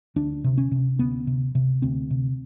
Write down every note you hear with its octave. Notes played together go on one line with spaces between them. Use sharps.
D2 D4
C3
C#4
C3
D2 B3
C3
C3
D2 C4
C3